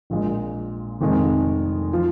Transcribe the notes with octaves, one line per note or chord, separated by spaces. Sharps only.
A#1 A#2 G#3
F1 F2 D#3 G#3
F3